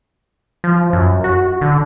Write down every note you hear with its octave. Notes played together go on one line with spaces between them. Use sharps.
F3
F#2
F#4
D3